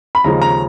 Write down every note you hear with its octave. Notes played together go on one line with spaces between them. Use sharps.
B5
D#2 C#3 F3 G#3 A#5
A#5